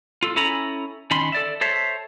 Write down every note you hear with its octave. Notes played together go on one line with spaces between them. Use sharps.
F4 A4
C#4 E4 A4 G#5 A#5 B5
D#3 C#4 B5 C6
A4 D5 E5
A4 C5 C#5 E5